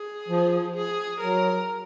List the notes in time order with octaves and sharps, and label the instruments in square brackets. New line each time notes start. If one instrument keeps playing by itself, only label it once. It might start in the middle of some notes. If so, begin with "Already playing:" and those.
Already playing: [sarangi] G#4
[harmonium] F3
[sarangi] G#4
[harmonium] F#3 [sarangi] A#4